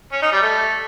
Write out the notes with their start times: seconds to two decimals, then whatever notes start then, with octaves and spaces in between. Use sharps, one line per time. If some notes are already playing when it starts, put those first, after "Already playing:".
0.12 C#4
0.22 D#4
0.32 G3
0.42 A3